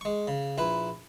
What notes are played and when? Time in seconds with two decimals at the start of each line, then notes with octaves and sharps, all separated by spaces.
0.01 G#3 C#6
0.28 C#3
0.58 A#1 E4 B4